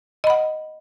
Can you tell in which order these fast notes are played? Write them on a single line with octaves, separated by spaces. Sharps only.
D#5 B5 F#5